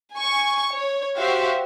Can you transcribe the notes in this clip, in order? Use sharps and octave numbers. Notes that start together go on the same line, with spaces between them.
G#5 C#6
C#5
F#4 G4 C5 E5 F5